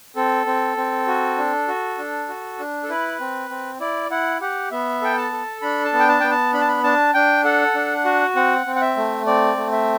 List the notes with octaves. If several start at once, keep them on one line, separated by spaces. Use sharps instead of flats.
C4 A4
C4
C4
F#4
D4
F#4
D4
F#4
D4
A4
E4 B4
C4
C4
E4 D5
E4 F#5
G4 F#5
B3 E5
A4 G5
A5
A4
D4 B5
A5
B3
G5
A5
B3 G5
A5
D4 B5
A5
B5
D4 A5
D4 G5
A4 F#5
D4
F#4
C4 F#5
C4
F#5
E5
A3
C4 D5
A3
E5